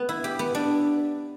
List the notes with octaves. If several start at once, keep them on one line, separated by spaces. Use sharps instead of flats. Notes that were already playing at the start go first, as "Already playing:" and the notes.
Already playing: B3
E4
G4
B3
D4